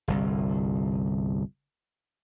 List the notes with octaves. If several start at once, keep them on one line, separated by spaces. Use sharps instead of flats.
G1 C2